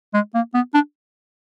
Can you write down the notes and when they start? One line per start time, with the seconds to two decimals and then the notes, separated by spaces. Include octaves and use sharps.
0.14 G#3
0.34 A#3
0.54 B3
0.74 D4